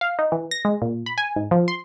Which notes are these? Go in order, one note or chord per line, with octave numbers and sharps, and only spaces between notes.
F5
D#4
E3
A#6
G#3
A#2
B5
G#5
G#2
F3
C6